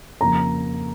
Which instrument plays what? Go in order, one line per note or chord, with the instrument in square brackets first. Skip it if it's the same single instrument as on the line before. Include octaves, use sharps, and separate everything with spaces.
[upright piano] F2 C#3 A#3 A#5